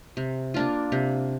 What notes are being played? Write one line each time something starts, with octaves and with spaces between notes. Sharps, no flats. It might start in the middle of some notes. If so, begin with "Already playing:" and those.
C3
A#3 D4 F4
C3